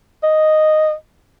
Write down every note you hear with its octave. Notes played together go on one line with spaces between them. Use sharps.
D#5